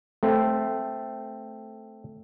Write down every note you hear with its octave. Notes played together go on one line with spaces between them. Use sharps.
A3 C4